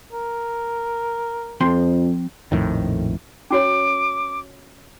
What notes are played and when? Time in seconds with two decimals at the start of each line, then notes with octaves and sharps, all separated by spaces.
0.13 A#4
1.61 F2 F3 C4 C6
2.52 A#1 F2 A2 D#3
3.51 C#4 F#4 C#5 D6